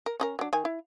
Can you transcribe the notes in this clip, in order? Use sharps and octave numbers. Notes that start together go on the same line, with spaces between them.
A#4
C#4 G#4 A#4
F#3 D4
D#3 G#5
E4